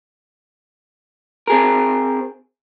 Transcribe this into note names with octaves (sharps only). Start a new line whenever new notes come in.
C4 G#4 A#4